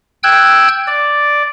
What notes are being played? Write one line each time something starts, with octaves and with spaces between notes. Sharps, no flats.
G5 E6 F#6 G#6
D5